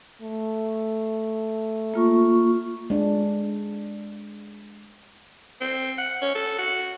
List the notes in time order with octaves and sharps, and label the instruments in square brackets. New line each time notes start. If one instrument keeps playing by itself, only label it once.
[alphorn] A3
[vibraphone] A#3 F4 C#6
[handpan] G#3 D4
[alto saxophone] C4
F#5
C#4
A4
F#4